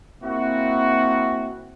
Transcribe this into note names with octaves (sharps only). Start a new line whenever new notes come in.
A#3 C4 E4 F#4